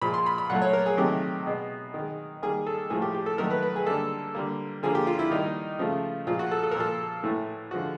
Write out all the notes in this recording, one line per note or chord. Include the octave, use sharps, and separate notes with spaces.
A#2 F3 G#3 B5
C6
B5
B5
A#2 F#3 A3 F#5
C#5
A#4
G#4
C3 D#3 F#3 A3 G4
B2 G#3
D#3 G#3
D#3 G3 A#3 G#4
A4
A2 F3 A3 G#4
G4
G4
A4
D#3 F#3 A3 A#4
B4
B4
G#4
D3 G3 A#3 A4
D3 G3 A#3
D3 F3 A#3 G#4
G4
F4
E4
D#3 G3 A#3 D#4
C#3 F3 A3
A#2 F3 G#3 F4
F#4
A4
A4
A#4
A#2 F3 A#3 A4
A2 E3 A3
D3 F3 G#3 F#4